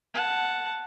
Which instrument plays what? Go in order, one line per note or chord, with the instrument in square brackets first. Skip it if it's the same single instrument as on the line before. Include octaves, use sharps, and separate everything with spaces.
[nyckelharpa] F#5 A5